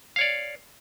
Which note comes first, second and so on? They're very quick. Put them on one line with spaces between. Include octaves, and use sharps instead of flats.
F5 C#5 D5